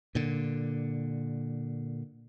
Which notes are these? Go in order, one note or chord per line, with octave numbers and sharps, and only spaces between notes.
A#2 D3